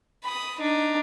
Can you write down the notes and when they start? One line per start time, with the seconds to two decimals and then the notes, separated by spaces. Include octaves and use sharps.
0.24 B5 D#6
0.59 D4 D#4